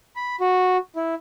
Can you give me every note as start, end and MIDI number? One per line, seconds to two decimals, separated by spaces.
0.16 0.36 83
0.40 0.77 66
0.96 1.15 64